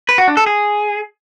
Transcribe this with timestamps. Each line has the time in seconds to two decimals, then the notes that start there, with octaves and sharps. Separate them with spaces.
0.09 B4
0.18 F#4
0.28 D4
0.37 A4
0.46 G#4